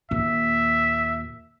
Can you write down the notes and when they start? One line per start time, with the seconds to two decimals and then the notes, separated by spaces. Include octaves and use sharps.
0.11 D#2 A#2 E5